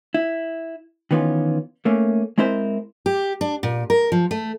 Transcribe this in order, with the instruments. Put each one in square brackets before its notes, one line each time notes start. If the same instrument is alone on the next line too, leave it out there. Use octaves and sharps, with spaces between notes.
[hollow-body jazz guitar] E4
D#3 E3 B3 C#4 F4
A3 A#3 C#4
G#3 C4 E4 A#4 C5
[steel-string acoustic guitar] G4
D4
A#2
A#4
F3
A3